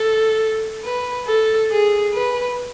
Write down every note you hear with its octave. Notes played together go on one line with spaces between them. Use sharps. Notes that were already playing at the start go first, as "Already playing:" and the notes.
Already playing: A4
B4
A4
G#4
B4